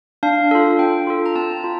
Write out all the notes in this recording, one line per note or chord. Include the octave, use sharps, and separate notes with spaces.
D4 F5
F4 A4
D4 G5
F4 A4
A#5
C4 A5
F4